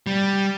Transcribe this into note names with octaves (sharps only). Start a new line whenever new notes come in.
G3